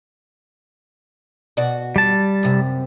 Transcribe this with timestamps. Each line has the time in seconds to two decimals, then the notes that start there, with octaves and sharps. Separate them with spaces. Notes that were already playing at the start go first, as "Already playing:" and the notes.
1.57 B2 F#4 D5
1.96 G3 A5
2.43 F#2 C3